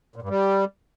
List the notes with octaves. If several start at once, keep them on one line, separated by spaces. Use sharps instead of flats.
A#2
G2
G3